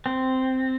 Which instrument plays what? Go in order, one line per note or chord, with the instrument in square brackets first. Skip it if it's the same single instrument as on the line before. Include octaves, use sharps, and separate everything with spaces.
[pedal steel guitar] C4